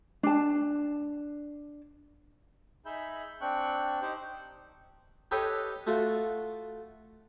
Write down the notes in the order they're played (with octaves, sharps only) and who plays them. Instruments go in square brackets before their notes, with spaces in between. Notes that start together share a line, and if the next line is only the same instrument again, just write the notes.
[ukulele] D4 A5
[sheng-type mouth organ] D#4 G#4 E5 B5 G6
C4 D4 G5 C#6 F#6
D#4 G4 C5
[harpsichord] G4 A4 B4 C#5 D#5 G5
A3 F4 F#4